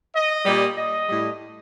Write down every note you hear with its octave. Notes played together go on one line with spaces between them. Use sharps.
D#5
A#2 G3
D#5
A2 G3